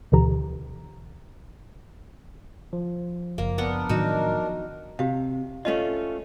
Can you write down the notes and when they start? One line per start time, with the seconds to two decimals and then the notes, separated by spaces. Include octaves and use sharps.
0.12 D2 B2 D3 E3 G4 A#5
2.73 F3
3.38 F#1 A#3
3.58 B3 D4 A#4 F#5
3.89 A2 D#3 F#3 D#4 F#4
4.99 C3 G4 F5
5.65 A3 C#4 F4 D#5